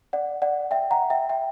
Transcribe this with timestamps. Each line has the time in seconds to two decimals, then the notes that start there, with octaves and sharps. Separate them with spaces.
0.13 D5 F#5
0.42 D5 F#5
0.71 E5 G5
0.91 F#5 A#5
1.10 E5 G5
1.29 E5 G5